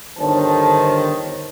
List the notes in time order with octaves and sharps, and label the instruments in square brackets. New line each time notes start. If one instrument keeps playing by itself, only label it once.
[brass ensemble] G1 D3 D#3 C5 C#5 A5